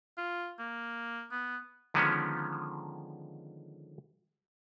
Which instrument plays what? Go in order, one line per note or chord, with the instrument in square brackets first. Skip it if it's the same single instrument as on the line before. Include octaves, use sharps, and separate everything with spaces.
[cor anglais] F4
A#3
B3
[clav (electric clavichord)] D3 D#3 F3 G#3 B3 C#4